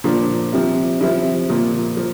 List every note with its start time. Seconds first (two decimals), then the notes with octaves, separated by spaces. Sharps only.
0.04 A#2 F3 D4
0.53 C3 F3
1.01 C3 F3 E4
1.49 A#2 F3
1.97 F3